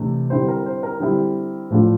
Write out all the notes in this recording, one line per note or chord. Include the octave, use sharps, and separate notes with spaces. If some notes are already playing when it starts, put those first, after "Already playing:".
Already playing: C3 E3 A3 D4
D3 G3 C4 E4 C5
A#4
C5
A#4
D3 G3 C4 E4
A2 F3 A3 D4 F4